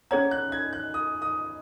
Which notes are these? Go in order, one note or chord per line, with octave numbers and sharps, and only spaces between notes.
C#4 G#4 C#5 F#5 A#5 G#6
F#6
G#6
F#6
D#6
D#6